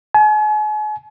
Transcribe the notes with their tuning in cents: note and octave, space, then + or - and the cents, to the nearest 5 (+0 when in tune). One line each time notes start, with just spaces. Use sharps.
G#5 +40